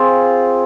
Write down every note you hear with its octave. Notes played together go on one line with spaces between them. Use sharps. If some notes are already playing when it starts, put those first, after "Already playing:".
Already playing: C4 F4 G#4